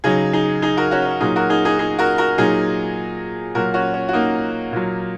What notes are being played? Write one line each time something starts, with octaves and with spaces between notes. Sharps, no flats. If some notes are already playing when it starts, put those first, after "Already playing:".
C#3 F#3 D#4 G#4
D#4 G#4
D#4 G#4
F#4 A#4
C#4 F#4
C#4
A#2 F#3 D#4 G#4
F#4 A#4
D#4 G#4
D#4 G#4
D#4 G#4
F#4 A#4
F#4 A#4
A#2 F#3 D#4 G#4
A#2 F#3 F#4 A#4
C#4 F#4
C#4
F#4
A#3 D#4
A#2 F#3